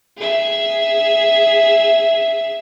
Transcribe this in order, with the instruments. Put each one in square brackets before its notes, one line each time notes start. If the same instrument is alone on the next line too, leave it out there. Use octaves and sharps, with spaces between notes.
[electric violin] G#4 E5